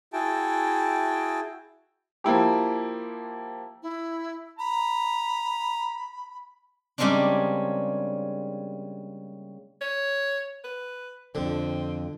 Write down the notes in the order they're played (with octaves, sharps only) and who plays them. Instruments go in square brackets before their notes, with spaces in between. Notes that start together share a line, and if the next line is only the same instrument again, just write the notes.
[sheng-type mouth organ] E4 F#4 G#4 G5 A5
[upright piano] F3 A#3 E4 G4
[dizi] E4
[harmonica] A#5 [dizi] B5
[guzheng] C#3 G3 G#3 A#3 C4 D4
[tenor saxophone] C#5
B4
[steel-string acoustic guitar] F2 F3 [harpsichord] D3 [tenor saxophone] C4